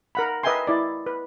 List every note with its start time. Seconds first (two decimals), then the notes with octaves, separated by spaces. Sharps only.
0.15 A#4 F#5 B5
0.43 B4 D#5 E5 G5 G#5 C6
0.67 E4 D5
1.06 B4